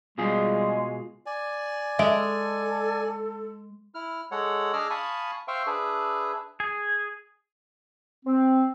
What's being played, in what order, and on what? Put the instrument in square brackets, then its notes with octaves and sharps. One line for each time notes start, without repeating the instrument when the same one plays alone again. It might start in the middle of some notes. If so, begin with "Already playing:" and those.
[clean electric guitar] B2 F4 G#4 [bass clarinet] G3 [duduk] G#3
[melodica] D5 G#5
[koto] G#3 [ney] A4 [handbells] D#5 E5 D7
[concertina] E4 F6
G#3 A4 C#5 F#5
D4 G#4 D#5 D6 E6 F6
F5 G#5 A5 B5 C#6 D#6
C5 E5 F5 G5 C6 C#6
D4 G#4 B4 E5
[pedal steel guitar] G#4
[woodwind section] C4